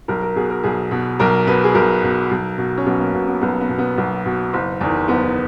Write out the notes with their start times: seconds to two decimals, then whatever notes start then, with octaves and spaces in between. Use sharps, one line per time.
0.08 B1 A#4
0.22 A#4
0.36 B2 G#4
0.50 A#4
0.63 B1 G#4
0.91 B2
1.19 B1 A#4
1.47 B2 B4
1.64 G#4
1.75 B1 A#4
2.04 B2
2.31 B1
2.58 B2
2.78 C#4
2.86 B1 B3
3.00 A#3
3.14 B2 B3
3.28 B3
3.41 B1 B3
3.60 B3
3.69 B2
3.78 B3
3.98 B1 B3
4.26 B2
4.53 F#1
4.81 E2 D#3
5.08 F#1 B3